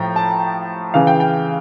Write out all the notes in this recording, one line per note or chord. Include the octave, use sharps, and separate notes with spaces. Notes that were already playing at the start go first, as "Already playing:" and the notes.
Already playing: A2 F3 G5 A#5
A5
C#3 E3 F5
G5
G5